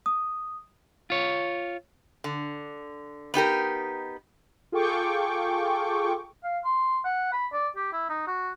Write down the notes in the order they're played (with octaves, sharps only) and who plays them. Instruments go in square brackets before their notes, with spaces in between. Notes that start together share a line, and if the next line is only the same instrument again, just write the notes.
[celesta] D#6
[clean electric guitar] F4 C#5
[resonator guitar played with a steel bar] D3
B3 D#4 G4 A#4
[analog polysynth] F4 G#4 A4 G5 C#6 D6
[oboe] F5
C6
F#5
B5
D5
G4
E4
D#4
F#4